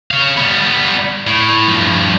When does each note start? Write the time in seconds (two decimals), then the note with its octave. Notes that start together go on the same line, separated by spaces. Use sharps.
0.11 C#5 F5
0.37 G3 B3
1.27 A2
1.68 G2 F3